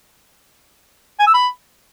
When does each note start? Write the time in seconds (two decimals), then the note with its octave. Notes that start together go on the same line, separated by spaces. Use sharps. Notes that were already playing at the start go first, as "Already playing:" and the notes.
1.19 G#5
1.26 E6
1.34 B5